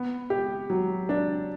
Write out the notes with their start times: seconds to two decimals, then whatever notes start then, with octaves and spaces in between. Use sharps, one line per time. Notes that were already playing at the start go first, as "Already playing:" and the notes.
Already playing: B3
0.30 G4
0.70 F#3
1.09 D4